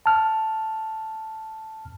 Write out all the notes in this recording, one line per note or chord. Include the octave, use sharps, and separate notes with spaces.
A5 F6